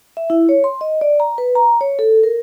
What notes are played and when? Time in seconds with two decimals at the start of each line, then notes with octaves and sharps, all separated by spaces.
0.17 E5
0.30 E4
0.49 C#5
0.64 C6
0.81 D#5
1.01 D5
1.20 A#5
1.38 B4
1.55 A#5
1.81 C#5
1.99 A4
2.23 A#4